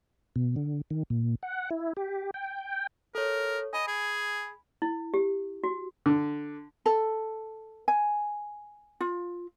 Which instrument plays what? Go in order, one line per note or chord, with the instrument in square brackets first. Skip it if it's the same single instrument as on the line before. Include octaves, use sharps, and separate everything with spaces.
[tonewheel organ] B2
D3
D#3
A#2
F#5
E4
G4
G5
[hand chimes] A4 C#5 [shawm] A#4
[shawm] D#5 [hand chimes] G#5 B5
[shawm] G#4
[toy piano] E4
G4
F#4
[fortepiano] D3
[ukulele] A4
G#5
F4